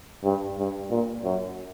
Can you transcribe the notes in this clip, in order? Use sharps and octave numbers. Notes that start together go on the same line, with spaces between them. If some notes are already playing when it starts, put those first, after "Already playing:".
G2
G2
A#2
F#2